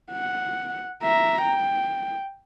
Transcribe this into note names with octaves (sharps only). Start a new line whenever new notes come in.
F#5
E5 A#5
G5